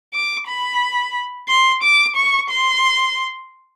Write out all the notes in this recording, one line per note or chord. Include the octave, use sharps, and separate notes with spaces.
D6
B5
C6
D6
C#6
C6